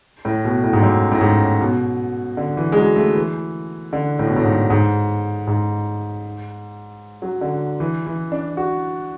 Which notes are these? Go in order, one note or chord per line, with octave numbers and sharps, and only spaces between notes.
A2
B2
A2
G#2
F#2
A2
G#2
B2
D3
E3
G#3
F#3
A3
E3
D3
A2
B2
A2
G#2
G#2
G#2
F#3
D3
E3
E3
D4
F#4